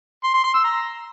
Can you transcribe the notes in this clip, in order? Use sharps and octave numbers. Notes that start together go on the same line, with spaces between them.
C6
C6
C6
E6
A#5